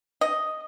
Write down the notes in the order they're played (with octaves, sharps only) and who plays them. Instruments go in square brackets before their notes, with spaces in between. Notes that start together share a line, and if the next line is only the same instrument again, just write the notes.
[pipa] D#5